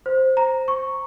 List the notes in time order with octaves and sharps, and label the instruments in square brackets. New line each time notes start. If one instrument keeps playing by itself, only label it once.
[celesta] C5
A#5
C#6